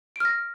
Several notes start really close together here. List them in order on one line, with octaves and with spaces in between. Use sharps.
D7 F6 A#6